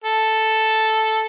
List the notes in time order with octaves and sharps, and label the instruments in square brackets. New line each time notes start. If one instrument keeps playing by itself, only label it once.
[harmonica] A4